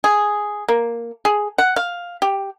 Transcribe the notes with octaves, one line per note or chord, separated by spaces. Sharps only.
G#4
A#3
G#4
F#5
F5
G4